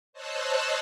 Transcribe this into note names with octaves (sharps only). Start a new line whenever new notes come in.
C5 C#5 D#5 A5 E6 F#6